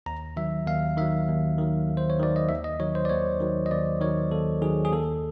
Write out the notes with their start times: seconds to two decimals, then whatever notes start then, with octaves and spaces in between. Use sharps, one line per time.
0.06 D#2 A#5
0.37 D#3 F#3 E5
0.67 D#2 F5
0.97 D#3 F#3 E5
1.28 D#2
1.58 D#3 F#3
1.88 D#2
1.97 C5
2.10 C#5
2.19 D#3 F#3 D5
2.36 D#5
2.49 D#2 E5
2.64 D#5
2.80 D#3 F#3 C#5
2.95 C5
3.05 D5
3.09 D#2 C#5
3.40 D#3 F#3
3.66 D#5
3.71 D#2 D5
4.01 D#3 F#3 C#5
4.32 D#2 A4
4.62 D#3 F#3 G#4
4.85 G#4
4.92 D#2 A4